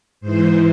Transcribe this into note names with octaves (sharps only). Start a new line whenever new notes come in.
G#2 E3 C5